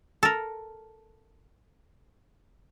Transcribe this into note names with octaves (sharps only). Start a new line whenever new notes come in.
A4 A#4